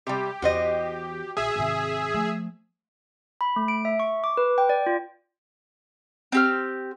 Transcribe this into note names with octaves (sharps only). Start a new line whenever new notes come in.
C3 G3 G4
E2 F#4 C5 D#5
A#1 G#4 E5
G#1 C3
F3 A3
B5
A3
D7
E5
C#6
D6
B4
G5
D5
F4
C4 G4 F6